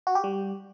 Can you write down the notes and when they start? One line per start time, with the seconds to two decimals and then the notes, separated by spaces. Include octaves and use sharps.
0.07 F#4
0.15 G4
0.24 G3